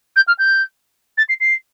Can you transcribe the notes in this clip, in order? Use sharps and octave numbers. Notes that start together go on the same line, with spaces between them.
G6
F6
G6
A6
C7
C7